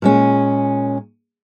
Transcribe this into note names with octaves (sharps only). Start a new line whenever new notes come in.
A#2 G#3 C#4